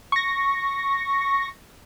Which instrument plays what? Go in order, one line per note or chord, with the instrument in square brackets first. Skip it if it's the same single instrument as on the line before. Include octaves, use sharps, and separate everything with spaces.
[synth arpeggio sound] C#6 A#6